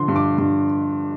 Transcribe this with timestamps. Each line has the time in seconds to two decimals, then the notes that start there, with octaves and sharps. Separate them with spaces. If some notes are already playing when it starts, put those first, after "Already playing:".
Already playing: D3 F3 C6
0.08 G2
0.16 D6
0.38 G2